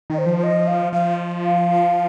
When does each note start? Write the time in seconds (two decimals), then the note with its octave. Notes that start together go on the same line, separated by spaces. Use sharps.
0.10 D#3 D#5
0.18 C5
0.26 F3
0.38 C5
0.43 D#5
0.67 F5
0.92 F3 F5
1.42 F5